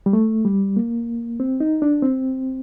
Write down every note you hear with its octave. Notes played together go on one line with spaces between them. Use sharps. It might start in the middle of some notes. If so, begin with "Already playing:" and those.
G3
A3
G3
A#3
C4
D#4
D4
C4